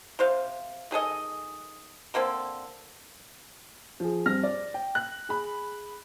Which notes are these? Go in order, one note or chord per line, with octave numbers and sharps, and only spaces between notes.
C3 C5 F5
D#3 G#4 A4 D#5
D3 A#3 C4 A4
F3 G#4
G2 C4 F6 A#6
D5
G5
F#6
G#4 B5